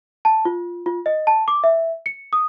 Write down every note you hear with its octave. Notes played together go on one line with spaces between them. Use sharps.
A5
F4
F4
D#5
A5
D6
E5
C#7
D#6